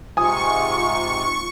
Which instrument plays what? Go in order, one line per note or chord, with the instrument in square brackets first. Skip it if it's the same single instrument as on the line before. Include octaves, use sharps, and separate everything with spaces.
[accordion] G#2 C3 [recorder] F4 [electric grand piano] G#5 D#6 [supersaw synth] C#6